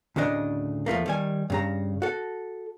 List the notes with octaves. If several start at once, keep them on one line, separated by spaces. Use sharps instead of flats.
D2 A2 C#3 D4 D#5
E2 F3 A3 A#3
D#3 G3 G#5
G2 C#3 A#5
F#4 A4